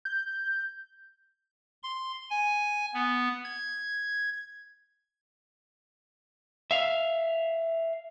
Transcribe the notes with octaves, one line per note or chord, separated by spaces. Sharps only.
G6
C6
G#5
B3
G#6
E5 F5